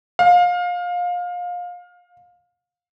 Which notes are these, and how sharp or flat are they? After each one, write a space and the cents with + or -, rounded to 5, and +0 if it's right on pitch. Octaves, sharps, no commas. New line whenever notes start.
F5 +25